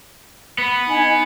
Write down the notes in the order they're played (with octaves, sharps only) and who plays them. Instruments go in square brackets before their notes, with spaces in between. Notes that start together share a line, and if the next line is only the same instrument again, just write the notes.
[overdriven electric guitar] B3
[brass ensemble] D#4 G#5